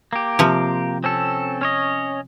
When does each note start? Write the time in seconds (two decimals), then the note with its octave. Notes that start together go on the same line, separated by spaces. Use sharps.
0.13 A#3 G4
0.39 C3 F3
1.04 C4 C#4 A4
1.61 C#4 C#5 D#5